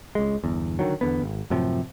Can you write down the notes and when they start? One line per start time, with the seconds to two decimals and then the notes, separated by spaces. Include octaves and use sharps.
0.15 C#2 G#3
0.44 G1 E2
0.79 D3 D#3 F#3
1.01 E2 D3 B3
1.22 G#1
1.50 F#2 A2 C3 F3